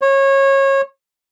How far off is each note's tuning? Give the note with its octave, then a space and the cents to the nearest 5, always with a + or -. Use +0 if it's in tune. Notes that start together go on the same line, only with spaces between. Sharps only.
C#5 -25